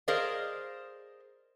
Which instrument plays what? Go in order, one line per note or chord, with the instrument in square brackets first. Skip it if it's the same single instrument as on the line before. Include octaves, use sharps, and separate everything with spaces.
[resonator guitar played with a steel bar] G#4 A#4 C5 D5 D#5 F5